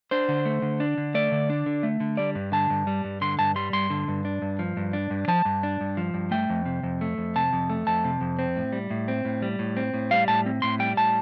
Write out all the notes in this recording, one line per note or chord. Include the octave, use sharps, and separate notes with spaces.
D4 C5
D3
A3
D3
D4
D3
A3 D5
D3
D4
D3
A3
D3
G3 D5
G2
D3 A5
G2
G3
G2
D3 C6
G2 A5
G3 C6
G2 C6
D3
G2
D4
G2
F3
G2
D4
G2
F3 A5
G2
D4
G2
F3
G2
A3 G5
F2
C3
F2
A3
F2
C3 A5
F2
A3
F2 A5
C3
F2
C4
A2
G3
A2
C4
A2
G3
A2
C4
A2
G3 F5
A2 A5
C4
A2 C6
G3 G5
A2 A5